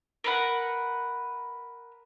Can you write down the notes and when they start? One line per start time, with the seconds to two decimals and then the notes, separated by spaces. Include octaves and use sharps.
0.24 A#4 B4 F#5